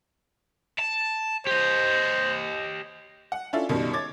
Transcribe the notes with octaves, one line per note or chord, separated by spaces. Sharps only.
A5
G4 C5 D#5
F#5
C#4 D4 E4 F4 A4
F#2 B2 D#3 G3
C#5 D6 G#6 A6